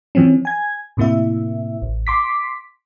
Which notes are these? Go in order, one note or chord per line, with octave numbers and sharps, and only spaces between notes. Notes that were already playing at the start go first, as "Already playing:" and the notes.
E3 F3 C4 C#4
G#5 G#6
A2 C3 A#3 E4 E5
A1
C6 D6 B6